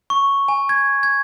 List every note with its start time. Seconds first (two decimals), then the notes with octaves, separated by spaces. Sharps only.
0.10 C#6
0.48 G#5
0.69 G#6
1.03 G#6